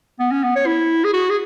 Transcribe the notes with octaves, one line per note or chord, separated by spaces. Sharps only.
B3
C#4
B3
C#5
E4
G#4
F#4
G#4